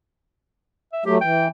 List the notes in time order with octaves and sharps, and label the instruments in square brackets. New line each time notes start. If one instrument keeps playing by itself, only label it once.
[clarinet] E5
[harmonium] F#3 A3 [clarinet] G4
[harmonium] E3 [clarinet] G5